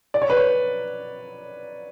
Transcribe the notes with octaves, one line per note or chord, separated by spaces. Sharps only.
D5
C#5
B4
C#5